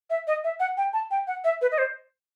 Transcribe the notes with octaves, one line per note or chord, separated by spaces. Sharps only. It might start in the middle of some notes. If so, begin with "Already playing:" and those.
E5
D#5
E5
F#5
G5
A5
G5
F#5
E5
B4
D#5
C5